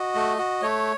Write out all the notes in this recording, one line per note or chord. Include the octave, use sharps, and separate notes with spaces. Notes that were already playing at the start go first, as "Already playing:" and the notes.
Already playing: F#4 D#5
A3
F#4
A3 C#5